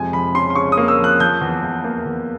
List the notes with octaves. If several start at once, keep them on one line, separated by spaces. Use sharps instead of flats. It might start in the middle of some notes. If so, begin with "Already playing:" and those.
Already playing: F2 C3 G#3 G#5
F3 B5
C#3 C6
C6
C#3 C#6
D#6
A#3
E6
F3
F#6
F3 G6
E2
E2
A#3
E2